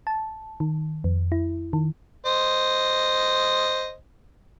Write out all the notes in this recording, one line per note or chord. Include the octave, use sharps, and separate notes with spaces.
A5
D#3
F2
E4
D#3
C5 D#5